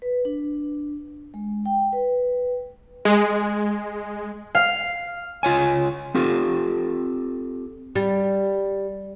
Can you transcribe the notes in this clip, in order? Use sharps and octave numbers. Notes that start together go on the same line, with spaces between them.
B4
D4
G#3
G5
B4
G#3
F5
C#2 F4 C#5 G#5
C4 F4 G4 A4
G3